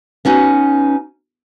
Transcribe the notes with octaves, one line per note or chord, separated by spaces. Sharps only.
B3 C#4 D#4 F#4